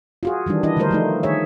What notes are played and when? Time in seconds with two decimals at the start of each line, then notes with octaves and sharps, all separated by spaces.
0.23 F4 F#4 G#4
0.46 D#3 E3 G3 D4
0.63 E3 D4 E4 D#5
0.77 D3 D#3 G3 A3 A#4 C5
0.91 F3 A3 D#4
1.23 D#3 G#4 C#5 E5